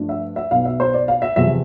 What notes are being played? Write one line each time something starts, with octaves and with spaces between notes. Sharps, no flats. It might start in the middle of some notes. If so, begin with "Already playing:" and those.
Already playing: G2 F3 A3 D4
E5
E5
B1 B2 B3 F5
E5
C5
D5
F5
E5
E2 C3 F3 E5